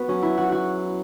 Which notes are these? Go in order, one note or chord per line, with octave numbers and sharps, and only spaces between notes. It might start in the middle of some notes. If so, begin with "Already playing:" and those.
Already playing: B3 F#4
F#3 C#4
E4
F#4
F#4